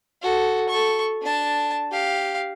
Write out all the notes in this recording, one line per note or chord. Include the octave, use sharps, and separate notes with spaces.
F#4 A4
A4 C#6
D4 A5
G4 F5